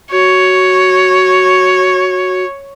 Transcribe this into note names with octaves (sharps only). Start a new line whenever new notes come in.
F#4 C#5